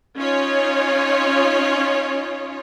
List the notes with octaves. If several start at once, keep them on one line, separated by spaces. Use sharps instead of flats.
C#4 D#4 F4 C#5